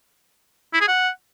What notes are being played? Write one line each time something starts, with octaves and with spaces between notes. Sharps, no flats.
E4
G#4
F#5